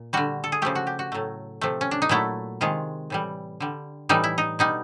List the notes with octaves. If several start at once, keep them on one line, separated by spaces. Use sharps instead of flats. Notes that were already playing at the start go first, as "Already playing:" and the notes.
Already playing: A#2
D3 G3 F#4
A4
G#4
C#3 F3 A3 G4
F#4
G4
F#4
A2 F#3 A3
C3 F3 A3
C#4
D4
D#4
A#2 F#3 A3 E4
C3 D#3 G#3 F4
A2 E3 G3
D3 G3
A2 E3 G3 D#4
E4
D#4
B2 G3 D#4